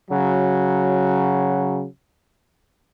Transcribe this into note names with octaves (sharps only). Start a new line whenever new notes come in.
C#3 F#3